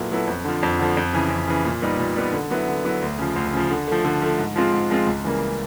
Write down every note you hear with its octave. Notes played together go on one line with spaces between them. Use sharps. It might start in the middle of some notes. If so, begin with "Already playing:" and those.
Already playing: A#2 F#3 B3 E4 A4
F#3 B3 E4 A4
F2
D3 F3
F2
D3 F3
F2
C#3 E3
F2
C#3 E3
A#2
G3 B3 D#4
A#2
G3 B3 D#4
D3
F#3 B3 E4
D3
F#3 B3 E4
D2
C#3 F3
D2
C#3 F3
D3
F3 A3
D3
F3 A3
G#2
F3 G#3 C4 F4
G#2
F3 G#3 C4 F4
C#2
C#3 E3 G3 A#3